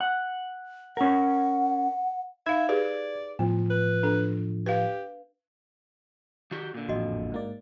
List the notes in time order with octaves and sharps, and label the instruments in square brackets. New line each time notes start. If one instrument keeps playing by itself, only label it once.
[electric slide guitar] F#5
[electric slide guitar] C#4 A#4 [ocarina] F#5
[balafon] D#4 F5 [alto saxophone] E5 [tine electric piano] G#6
[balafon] G4 G#4 B4 [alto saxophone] D5
[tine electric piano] A2 F3 [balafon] B3
[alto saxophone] B4
[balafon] D4 A4
[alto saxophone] G4 [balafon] B4 F5
[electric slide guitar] D#3 F#4 G4
A#2 D3
[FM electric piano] A1 F2 [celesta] F#4 D#5
[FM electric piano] G#2 A#3 D5